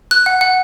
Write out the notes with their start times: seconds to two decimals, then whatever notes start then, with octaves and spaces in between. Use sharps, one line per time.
0.11 F#6
0.26 F#5
0.41 F#5